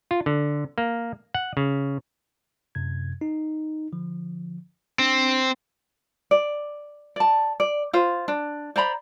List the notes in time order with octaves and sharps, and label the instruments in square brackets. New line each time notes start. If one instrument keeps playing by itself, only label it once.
[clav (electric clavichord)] F4
D3
A#3
F#5
C#3
[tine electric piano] F#2 C3 G#6
D#4
D3 F3
[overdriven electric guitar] C4 [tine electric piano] D4
[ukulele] D5
D5 A5
D5
F4 C5
D4
C5 D5 A#5 B5